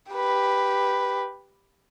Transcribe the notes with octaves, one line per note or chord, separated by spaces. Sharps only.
G4 B4